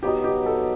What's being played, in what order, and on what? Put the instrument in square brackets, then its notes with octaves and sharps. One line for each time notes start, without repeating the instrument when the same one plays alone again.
[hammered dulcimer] B2 F#3 B3 D#4 [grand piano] G4
[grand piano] G4
A4